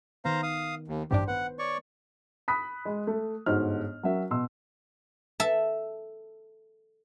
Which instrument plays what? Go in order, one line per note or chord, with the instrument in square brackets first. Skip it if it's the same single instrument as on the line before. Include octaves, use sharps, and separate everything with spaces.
[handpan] D#3 B3 [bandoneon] C5 F5 A#5
[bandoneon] F5 D#6
D#2
[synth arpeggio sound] A1 G2 D4 [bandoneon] G4 [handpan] C5
[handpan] B3 B4 [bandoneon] F#5
[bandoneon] C#5 D5 C#6
[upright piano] B5 D#6 F#6 B6
G#3
A3
G1 G#2 D#4 F#4 C5 F6
F#3 C#4 F#4 A#4 E5
B2 C6 E6
[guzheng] A4 E5 A5